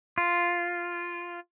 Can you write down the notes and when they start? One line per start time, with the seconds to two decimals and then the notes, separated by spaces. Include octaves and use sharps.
0.18 F4